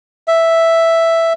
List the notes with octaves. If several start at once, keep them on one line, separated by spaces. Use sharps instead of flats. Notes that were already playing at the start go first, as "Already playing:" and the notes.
E5